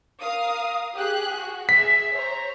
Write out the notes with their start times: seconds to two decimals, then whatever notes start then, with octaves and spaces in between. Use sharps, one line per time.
0.21 A#4 F5 D#6
0.97 G4 G#4 F#6
1.37 F#4
1.69 G#4 E5 B6
2.14 C5 C#5 A#5